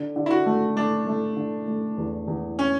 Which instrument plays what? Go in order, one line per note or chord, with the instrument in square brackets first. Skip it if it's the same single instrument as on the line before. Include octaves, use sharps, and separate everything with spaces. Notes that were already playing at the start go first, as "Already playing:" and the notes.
Already playing: [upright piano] D3
D3
[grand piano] E4
F#4
[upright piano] A3
[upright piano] A3 [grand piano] D4
[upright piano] A3
D3
A3
E2
E2
[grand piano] C#4